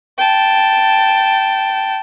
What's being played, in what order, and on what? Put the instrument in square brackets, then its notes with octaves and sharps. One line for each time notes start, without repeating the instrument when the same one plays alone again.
[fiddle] G5 A5